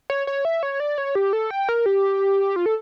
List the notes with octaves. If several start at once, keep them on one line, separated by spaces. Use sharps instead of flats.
C#5
C#5
E5
C#5
D5
C#5
G4
A4
G5
A#4
G4
F4
A4